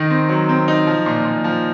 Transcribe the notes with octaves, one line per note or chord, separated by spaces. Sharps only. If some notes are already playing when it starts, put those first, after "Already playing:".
Already playing: D#3 D#4
C4
F#3
C4
D#4
F3
A#2
A#2
F3